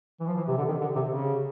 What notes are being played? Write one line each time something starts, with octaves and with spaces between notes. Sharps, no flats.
E3
F3
E3
C3
D3
D#3
D3
C3
C#3